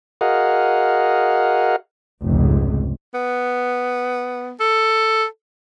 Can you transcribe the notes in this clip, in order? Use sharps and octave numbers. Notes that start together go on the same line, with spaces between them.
F#4 G#4 A#4 D#5 F5 F#5
F1 C#2 G#2
B3
A4